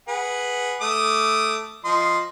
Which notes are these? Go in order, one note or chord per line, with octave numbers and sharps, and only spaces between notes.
G#4 B4 F#5
A3 D6 D#6
F3 D#5 C6